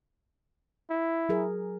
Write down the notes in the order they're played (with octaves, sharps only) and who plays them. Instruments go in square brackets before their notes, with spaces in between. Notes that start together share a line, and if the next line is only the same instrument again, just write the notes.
[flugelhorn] E4
[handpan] F#3 G#4 A#4